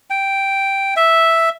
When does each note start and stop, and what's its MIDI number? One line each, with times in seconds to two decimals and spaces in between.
0.10 0.94 79
0.96 1.49 76